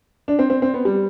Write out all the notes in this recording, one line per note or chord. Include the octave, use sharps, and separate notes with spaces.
D4
C4
C4
C4
B3
G3